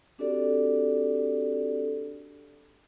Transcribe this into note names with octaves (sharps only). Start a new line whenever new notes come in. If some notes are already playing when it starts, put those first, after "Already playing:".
C4 D4 F#4 G4 A4 D5